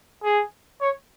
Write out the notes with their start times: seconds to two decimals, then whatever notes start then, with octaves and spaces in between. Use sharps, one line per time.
0.24 G#4
0.81 C#5